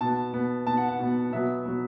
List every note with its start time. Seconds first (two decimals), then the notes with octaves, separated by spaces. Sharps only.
0.01 B2 B3 A5
0.33 B2 B3
0.67 B2 B3 A5
0.77 F#5
0.88 F#5
0.99 B2 B3
1.32 B2 F#3 B3 E5
1.66 B2 F#3 B3